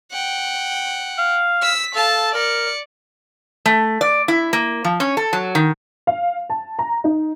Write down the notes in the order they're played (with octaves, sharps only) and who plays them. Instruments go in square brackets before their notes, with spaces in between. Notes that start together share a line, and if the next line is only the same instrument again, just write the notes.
[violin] F#5 G5
[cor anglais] F5
[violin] E6 B6
[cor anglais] A4 [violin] F5 A5
[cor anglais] A#4 [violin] D5 C#7
[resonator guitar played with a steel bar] A3
D5
E4
A#3
F3
C#4
A4
F#3
D#3
[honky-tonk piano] F5
A5
A#5
D#4